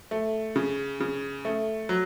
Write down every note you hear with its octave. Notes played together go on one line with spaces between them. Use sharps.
A3
C#3
C#3
A3
F#3